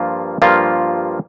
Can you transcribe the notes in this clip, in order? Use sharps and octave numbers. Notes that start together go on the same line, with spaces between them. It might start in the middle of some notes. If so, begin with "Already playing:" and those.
Already playing: G2 F3 A#3 F4
G2 F3 A#3 F4